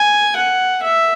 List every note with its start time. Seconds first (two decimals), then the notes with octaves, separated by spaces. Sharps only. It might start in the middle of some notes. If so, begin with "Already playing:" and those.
Already playing: G#5
0.35 F#5
0.82 E5